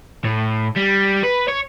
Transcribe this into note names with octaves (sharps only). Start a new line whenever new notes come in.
A2
G3
B4
C#5